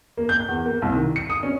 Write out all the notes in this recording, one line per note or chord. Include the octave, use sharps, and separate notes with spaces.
A#3
G6
E2
A#3
C2
D#3
C#7
D#6
C#4